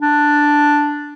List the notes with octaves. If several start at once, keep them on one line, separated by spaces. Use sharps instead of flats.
D4